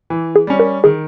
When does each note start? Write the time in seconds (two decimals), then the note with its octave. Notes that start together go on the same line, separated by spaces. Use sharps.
0.10 E3
0.36 G#4
0.47 G3 C#4
0.60 A#4
0.84 D#3 G#4